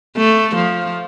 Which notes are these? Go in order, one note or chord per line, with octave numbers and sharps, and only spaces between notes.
A3
F3